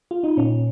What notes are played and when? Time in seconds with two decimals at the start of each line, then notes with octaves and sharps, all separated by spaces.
0.11 F4
0.24 D#4
0.37 A#2 C#4